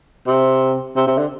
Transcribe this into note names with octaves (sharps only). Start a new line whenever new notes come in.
C3
C3
C3
D3